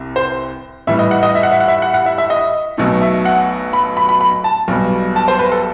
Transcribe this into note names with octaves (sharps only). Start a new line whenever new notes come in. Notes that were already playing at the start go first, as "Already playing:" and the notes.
Already playing: C2 C3
C5
A2 E3 G3 E5
D#5
F#5
D#5
E5
F#5
E5
F#5
E5
F#5
F#5
E5
E5
D#5
B1 B2 F#3 A3 D#4
E5
F#5
B5
B5
B5
B5
A5
B1 B2 G3
A5
C5
B4
A4